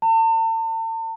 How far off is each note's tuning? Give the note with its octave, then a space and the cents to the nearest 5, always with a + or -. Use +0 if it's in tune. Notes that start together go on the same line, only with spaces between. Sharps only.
A5 +40